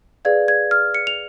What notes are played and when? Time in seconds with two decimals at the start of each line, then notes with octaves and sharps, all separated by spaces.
0.25 G#4 B4 D5 F5 G#6
0.48 G#6
0.71 F6
0.95 C#7
1.07 F7